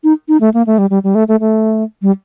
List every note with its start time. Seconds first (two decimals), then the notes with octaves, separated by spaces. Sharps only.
0.04 D#4
0.28 D#4
0.41 A3
0.54 A#3
0.67 A3
0.78 G3
0.90 G3
1.04 G3
1.15 A3
1.28 A3
1.40 A3
2.02 G3